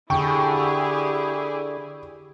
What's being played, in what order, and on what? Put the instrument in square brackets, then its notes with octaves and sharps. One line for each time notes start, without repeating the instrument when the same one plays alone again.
[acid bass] D3 [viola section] E4 G4 G#4 [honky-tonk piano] G5 C#6